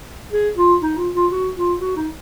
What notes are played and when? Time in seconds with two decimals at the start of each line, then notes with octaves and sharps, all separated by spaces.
0.32 G#4
0.57 F4
0.82 D#4
0.98 F4
1.15 F4
1.32 F#4
1.56 F4
1.80 F#4
1.97 D#4